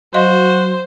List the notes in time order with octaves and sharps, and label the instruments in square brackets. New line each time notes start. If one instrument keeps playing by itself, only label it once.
[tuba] F#3 [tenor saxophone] F#4 [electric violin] C5 [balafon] D#5 F5 C6